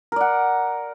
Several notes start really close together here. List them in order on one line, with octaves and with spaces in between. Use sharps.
A#4 D5 F#5